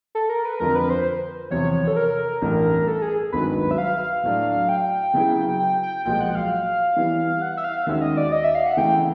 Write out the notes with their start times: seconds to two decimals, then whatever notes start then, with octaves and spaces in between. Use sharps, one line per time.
0.15 A4
0.29 A#4
0.45 B4
0.60 F2 D3 F3 A#4
0.75 B4
0.90 C5
1.51 E2 C3 F3 C#5
1.88 A4
1.96 A#4
2.42 A1 G2 E3 A3
2.87 A4
3.02 G#4
3.32 G#1 G2 D#3 F#3 B4
3.71 E5
3.78 F5
4.23 A2 F#3 A3 D4
4.69 G5
5.14 C#3 F#3 B3 E4 G#4
5.59 G5
5.83 G5
6.05 B1 A#2 F3 G#3 G5
6.21 F#5
6.35 F5
6.96 E3 G3 B3 E4
7.42 F#5
7.57 E5
7.64 F5
7.86 D#2 D#3 G#3 C#4 F#4 E5
8.02 D#5
8.17 D5
8.32 D#5
8.44 E5
8.55 F5
8.66 F#5
8.77 C#3 E3 A3 G5